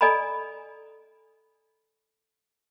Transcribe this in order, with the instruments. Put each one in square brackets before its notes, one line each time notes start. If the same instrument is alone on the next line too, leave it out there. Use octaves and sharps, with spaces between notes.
[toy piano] A4 D5 D#5 G#5 A#5 B5